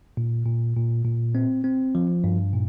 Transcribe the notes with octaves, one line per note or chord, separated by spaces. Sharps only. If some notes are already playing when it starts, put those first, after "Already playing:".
A#2
A#2
A#2
A#2
C4
C4
F3
G2
A#2